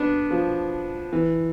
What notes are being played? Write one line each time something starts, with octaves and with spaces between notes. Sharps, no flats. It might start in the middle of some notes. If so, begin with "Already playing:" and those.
Already playing: B3 D4
F3
E3